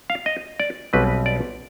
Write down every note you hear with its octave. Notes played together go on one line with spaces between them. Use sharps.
F5
D#5
D5
B1 B2 G3 C4 B4
D5